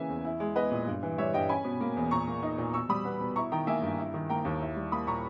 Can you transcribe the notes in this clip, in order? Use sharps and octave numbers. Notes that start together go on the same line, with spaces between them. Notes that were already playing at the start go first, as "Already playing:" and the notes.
Already playing: C#3 E3 A#3 E5 G#5
E2
E4
G#3
B3 B4 D#5
A#2
G2
E3
G3 C#5 E5
G2 D#5 G5
C#4 G#5 B5
B2
A#3
E2
A#2 A#5 C#6
A#3
D#4
A#2
B2 C#6 E6
G3 B5 D#6
B3
B2
E4 A#5 C#6
D#3 G5 A#5
A#3 E5 G#5
G2
E4
D#3
A#3 G5 A#5
D#2
E4
G3
A#3 B5 D#6
A#2 A#5 C#6